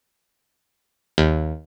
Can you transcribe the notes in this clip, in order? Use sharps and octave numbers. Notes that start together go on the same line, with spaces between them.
D#2